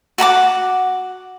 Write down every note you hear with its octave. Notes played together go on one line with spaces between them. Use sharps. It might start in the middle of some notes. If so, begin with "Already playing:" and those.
F#4 F#5 A#5 D6